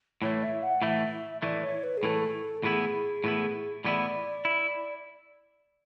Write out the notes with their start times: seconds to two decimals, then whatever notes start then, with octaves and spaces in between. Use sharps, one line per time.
0.22 A2 E3 A3 C#5
0.42 E5
0.62 F#5
0.82 A2 E3 A3 E5
1.42 A2 E3 A3 D5
1.62 C#5
1.83 B4
1.97 G#4
2.03 A2 E3 A3 A4
2.63 A2 E3 B3 E4 G#4
3.24 A2 E3 B3 E4
3.84 A2 E3 B3 E4 D5
4.45 E4